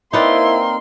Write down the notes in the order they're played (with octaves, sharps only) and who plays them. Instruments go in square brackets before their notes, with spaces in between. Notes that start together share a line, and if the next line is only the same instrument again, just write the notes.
[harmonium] A#3 C4 A#4 [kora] D#4 B4 D5 [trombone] E4 [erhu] C6